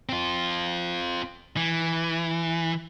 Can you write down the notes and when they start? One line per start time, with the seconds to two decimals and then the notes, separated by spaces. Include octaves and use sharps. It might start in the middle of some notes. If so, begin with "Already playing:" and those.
0.09 C4 F4
1.57 E3